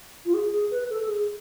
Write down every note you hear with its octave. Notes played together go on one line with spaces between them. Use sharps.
F4
G#4
G#4
B4
A4
A4
G#4